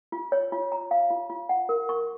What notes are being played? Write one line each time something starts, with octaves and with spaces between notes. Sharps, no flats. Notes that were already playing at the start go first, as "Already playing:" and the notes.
F4
C#5
F4
A#5
F5
F4
F4
F#5
A#4
C#6